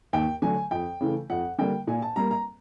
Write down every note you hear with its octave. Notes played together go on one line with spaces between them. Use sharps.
D#2 G5
D3 F#3 A3 G#5
F2 G5
C#3 E3 A3
F2 F#5
D3 G3 A#3 G5
A#2 G#5
A5
G3 A#3 A#5
A#5